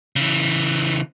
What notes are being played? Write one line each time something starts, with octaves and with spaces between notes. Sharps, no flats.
C#3 E3